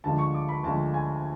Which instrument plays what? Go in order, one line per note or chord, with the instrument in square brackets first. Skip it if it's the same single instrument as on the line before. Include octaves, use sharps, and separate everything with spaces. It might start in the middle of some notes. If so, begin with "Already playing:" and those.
[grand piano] D2 D3 F3 G#3 A5
C#6
D6
B5
D2 D3 F3 G#3 A5
G#5